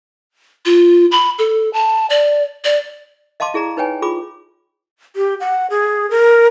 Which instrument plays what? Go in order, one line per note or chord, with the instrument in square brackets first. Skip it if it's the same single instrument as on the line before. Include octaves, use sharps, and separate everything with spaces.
[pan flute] F4
B5
A4
A5
D5
D5
[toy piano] D#5 F5 A5 C6 D6
E4 G#4 D5 A#5
D#4 B4 C#5 G5 G#5
F4 G#4 B5 D6
[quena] G4
F#5
G#4
A#4